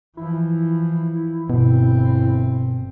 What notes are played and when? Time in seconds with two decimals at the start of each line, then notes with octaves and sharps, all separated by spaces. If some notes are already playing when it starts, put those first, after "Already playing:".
0.17 E3 F3 E4
1.50 G1 B2 C4